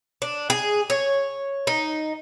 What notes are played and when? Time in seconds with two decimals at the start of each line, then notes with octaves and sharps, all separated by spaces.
0.22 D4
0.50 G#4
0.90 C#5
1.67 D#4